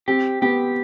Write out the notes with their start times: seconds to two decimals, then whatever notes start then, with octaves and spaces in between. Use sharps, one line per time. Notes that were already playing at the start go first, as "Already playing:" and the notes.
0.08 C4 G4
0.42 B3 G4